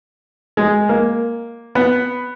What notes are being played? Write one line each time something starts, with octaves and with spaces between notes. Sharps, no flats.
G#3
A#3
B3